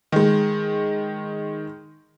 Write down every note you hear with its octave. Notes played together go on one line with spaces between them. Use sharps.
D#3 G#3